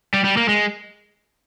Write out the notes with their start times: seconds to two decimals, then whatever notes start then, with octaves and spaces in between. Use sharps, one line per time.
0.14 G3
0.24 G3
0.37 A#3
0.49 G#3